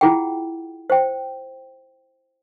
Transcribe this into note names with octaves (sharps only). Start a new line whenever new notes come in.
E4 F4 G#4 F#5 G5
C5 G5